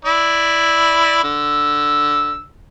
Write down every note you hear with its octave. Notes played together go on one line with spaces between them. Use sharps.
E4 D5
D3 E6